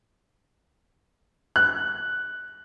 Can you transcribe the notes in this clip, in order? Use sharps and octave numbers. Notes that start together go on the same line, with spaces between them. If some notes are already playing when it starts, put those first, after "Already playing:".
F#6